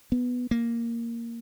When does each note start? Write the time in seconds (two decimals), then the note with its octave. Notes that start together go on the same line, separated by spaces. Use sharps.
0.12 B3
0.51 A#3